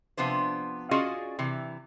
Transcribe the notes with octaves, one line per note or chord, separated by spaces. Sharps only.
C3 F3 B3 D4 C5
C#4 F4 F#4 G#4 D5 D#5
C3 E3